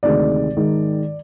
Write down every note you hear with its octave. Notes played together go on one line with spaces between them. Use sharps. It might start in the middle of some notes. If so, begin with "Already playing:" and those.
D2 C3 D#3 G#3 D5
G#2 D#3 G#3